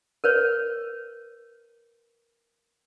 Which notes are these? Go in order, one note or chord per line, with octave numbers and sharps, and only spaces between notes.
A#4 B4 C#5